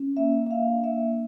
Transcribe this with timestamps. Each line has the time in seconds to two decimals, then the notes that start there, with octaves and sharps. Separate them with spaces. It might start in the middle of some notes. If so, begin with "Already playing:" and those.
Already playing: C#4
0.17 A#3 E5
0.46 E5
0.51 D4 F5
0.84 A#3 E5